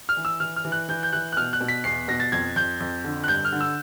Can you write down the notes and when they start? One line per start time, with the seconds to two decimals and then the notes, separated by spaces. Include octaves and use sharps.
0.09 F6
0.17 E3
0.25 E6
0.40 E3 F6
0.56 F6
0.65 E3
0.72 F#6
0.89 E3 G6
1.03 G6
1.13 E3 F#6
1.32 F#6
1.37 B2 F6
1.53 F#6
1.61 B2
1.68 B6
1.84 E2 C7
2.08 B2 A#6
2.20 A6
2.32 F2 G#6
2.56 F2 G6
2.80 F2
3.04 D3
3.24 F#6
3.28 G2 G6
3.45 F6
3.52 D3
3.61 E6